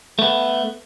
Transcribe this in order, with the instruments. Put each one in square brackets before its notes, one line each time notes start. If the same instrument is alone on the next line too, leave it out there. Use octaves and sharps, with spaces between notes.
[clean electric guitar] A3 B3